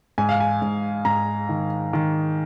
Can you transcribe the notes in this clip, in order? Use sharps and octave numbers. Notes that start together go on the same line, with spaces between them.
G#2 G#5
F5
G#5
G#2
G#2 A#5
D#3
D#3